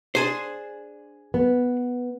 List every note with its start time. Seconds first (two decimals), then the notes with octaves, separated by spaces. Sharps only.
0.15 D4 G#4 C5
1.34 B3